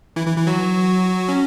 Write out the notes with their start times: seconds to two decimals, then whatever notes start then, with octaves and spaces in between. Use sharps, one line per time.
0.16 E3 E4
0.27 E3 E4
0.37 E3 E4
0.47 F#3 F#4
1.29 C#4